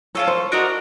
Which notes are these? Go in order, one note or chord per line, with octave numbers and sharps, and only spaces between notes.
C#4 F4 A4 C#5
C5
D4 F#4 A#4 D#5